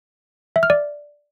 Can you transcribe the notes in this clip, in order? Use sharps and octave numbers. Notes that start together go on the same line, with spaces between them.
E5
F6
D5